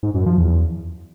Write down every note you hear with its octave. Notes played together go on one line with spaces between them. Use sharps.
G#2
F#2
F3
E2